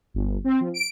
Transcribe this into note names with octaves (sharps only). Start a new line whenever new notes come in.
G1
C4
F3
D7